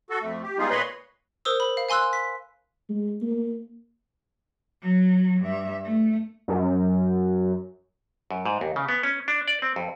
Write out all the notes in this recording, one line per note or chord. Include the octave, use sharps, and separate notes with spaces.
F#4 A4
F2 A3
G4
G3 G#3 B3 D#4 F4 G#4
A#2 B4 C#5 D#5 B5 C6
A#4 C5 D#6 E6
B5
F5
F5 G#5 C6 E6 F#6
B6
G#3
A#3
F#3
G2 E5
A3
F#2
F#2
G#2
D#2
C#3
B3
C#4
D4
D5
C4
F2